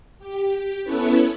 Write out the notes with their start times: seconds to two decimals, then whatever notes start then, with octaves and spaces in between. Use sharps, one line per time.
0.19 G4
0.84 B3 C#4 E4 A4 B4 C#5